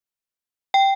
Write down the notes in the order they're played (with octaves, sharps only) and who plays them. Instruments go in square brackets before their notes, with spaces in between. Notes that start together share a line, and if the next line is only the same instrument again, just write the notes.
[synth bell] G5